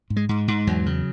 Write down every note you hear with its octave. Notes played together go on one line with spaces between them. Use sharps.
G#2
G#3
G#2
G#2
E2 F#3
C#3